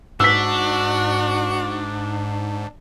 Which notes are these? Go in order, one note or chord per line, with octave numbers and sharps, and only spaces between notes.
G#2 D4 F#4 E6 B6